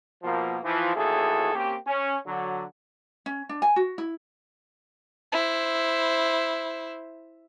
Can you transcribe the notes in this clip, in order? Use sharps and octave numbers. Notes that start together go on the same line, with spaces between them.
B2 F3 A#3
E3 F3
A1 D#2 E4 F#4 G#4 A4
A#3 C4 C#4 G4
C#4
D3 F#3
C#4
D4
G#5
F#4
E4
E4 C5